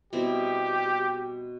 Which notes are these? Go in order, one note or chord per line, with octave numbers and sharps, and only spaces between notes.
B2 G3 C4 E4 G4